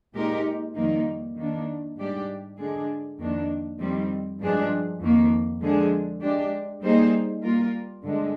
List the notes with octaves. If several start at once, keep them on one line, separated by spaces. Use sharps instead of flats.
A#2 G#3 D#4 G4 A#4
F2 D#3 G3 A#3 D#4
D#3 A#3 D4
G#2 G3 D4 G4 D5
D3 G#3 D4 G#4
F2 D#3 A#3 D4
F2 D#3 G3 C4
G2 F3 G#3 D4 G#4
F2 D#3 A#3
D3 F3 G#3 D4 G#4
G#3 D4 G4
G3 A#3 D#4 G#4 C5
G3 A#3 F4 A#4
G2 D3 G#3 D4